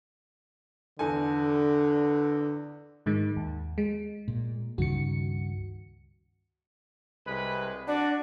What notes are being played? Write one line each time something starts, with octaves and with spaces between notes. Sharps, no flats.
E2 D3 A4 G#5
G#2 D#3 G#3
D#2
G#3
A#2
C#2 G2 D#3 F#4 C#7
C2 G#3 B4
D4 F#4 D5